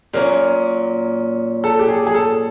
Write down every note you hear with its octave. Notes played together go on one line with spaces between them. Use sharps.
A#2 F#3 A#3 C#4 A#4
A4
G4
G#4
G#4
A4